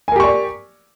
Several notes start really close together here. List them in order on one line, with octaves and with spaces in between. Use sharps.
G#5 A#4 G4 C#6 D5